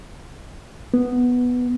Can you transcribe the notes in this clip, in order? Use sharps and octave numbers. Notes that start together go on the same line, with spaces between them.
B3